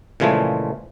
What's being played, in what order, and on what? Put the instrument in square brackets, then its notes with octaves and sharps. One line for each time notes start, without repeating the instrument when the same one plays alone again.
[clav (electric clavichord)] A#2 C#3 E3 F3 G#3 A3